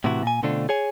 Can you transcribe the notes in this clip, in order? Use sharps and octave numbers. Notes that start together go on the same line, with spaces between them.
A2 C3 E3 E4 F#4
A#2 G#5
B2 D3 A3 C4 D4 F4
G#4 C#5 G#5